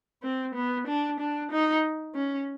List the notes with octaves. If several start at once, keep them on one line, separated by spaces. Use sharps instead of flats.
C4
B3
D4
D4
D#4
C#4